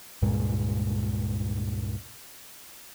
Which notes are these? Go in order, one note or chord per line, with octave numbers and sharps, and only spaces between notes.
C#2 G2 A#2 G#3